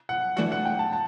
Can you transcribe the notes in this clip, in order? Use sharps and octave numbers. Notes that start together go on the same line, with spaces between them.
F#5
E3 A3 D4 F#4 F#5
F#5
G5
A5
A5